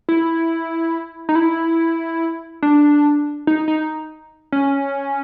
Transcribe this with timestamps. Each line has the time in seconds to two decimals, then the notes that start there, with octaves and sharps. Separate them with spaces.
0.09 E4
1.29 D#4
1.35 E4
2.63 D4
3.47 D#4
3.68 D#4
4.52 C#4